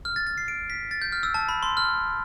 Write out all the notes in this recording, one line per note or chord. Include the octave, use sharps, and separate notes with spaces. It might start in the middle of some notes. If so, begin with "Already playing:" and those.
F6
A6
A6
C7
D7
B6
A6
G6
F6
E6
A5
B5
C6
F6